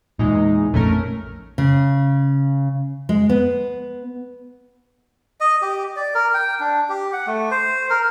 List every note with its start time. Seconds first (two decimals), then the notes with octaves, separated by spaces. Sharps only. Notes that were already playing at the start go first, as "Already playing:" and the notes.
0.19 E2 A#2 G#3 D#4
0.74 A#1 F2 A#2 A3 C#4 A#4
1.58 C#3
3.09 G#3
3.30 B3
5.41 D#5
5.62 G4
5.96 D5
6.15 A#4
6.34 G5
6.60 D4
6.89 G4
7.13 F#5
7.27 A3
7.51 C5
7.90 A#4